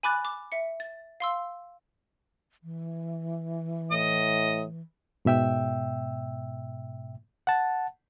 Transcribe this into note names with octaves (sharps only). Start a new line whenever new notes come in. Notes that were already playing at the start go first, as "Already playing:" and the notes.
G#5 B5 D6 F#6 A6
D6
E5 C#7
A6
F5 C6 E6
E3
A2 D#5
G#2 B2 E5 G5 E6
F#5 A5